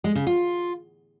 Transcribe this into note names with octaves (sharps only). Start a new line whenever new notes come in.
G#3
C#3
F4